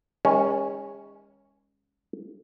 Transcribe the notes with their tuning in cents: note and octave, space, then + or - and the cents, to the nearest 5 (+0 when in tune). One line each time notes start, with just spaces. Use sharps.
D#3 +40 G#3 -35 C#4 -5